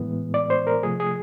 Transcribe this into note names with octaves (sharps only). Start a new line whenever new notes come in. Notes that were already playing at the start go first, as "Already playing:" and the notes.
Already playing: A2 E3 G#3 B3
D5
C5
A#4
C3 F3 A3 G#4
G#4